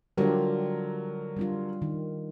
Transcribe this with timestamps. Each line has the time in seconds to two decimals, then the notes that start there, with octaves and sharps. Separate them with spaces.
0.17 D3 F#3 G3 F4 G4 A#4
1.37 G3 D4 F4
1.82 D#3